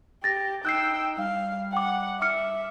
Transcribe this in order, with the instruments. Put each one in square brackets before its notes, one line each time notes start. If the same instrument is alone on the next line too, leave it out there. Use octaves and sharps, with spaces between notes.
[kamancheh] G4 [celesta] A6 A#6
[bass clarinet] D#4 [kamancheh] G5 E6 [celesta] F#6 G6 C7
[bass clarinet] G3 [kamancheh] F5
[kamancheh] F#5 [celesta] G5 D6
[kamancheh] E5 [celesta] D6 F6 C#7